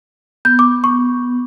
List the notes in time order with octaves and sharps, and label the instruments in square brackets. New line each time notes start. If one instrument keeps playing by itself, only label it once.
[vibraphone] B3 [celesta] G6
[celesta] D6
C#6